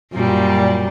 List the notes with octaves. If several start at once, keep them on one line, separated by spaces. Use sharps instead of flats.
F#2 A#2 G3